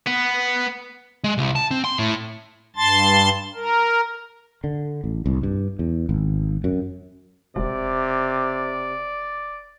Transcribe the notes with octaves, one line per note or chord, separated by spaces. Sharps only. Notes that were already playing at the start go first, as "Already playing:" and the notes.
B3
G#3
C2
A5
C4
C6
A2
G2 A5 C6 A6
A#4
D3
A1
C2
G2
E2
G#1
F#2
E1 C3 D5